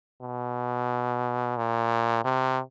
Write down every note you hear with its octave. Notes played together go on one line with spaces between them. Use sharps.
B2
A#2
C3